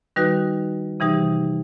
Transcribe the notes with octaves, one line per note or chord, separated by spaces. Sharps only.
D#3 G3 D#4 F#4 B4
C3 E3 G3 D#4 G4